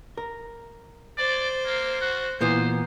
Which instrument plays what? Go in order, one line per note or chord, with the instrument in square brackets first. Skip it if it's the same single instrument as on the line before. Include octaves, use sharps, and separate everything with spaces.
[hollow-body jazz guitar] A#4
[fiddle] C5 [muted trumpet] D5
[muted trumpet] A#3
F#4
[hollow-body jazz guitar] A#2 E3 B3 [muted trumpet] C5